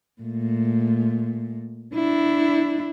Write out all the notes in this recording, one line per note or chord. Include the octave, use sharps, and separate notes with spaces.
A#2 A3
D4 E4